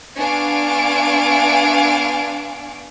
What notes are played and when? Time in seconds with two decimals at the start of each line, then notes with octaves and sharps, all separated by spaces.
0.19 B3 D4 F5 G#5 C#6 D7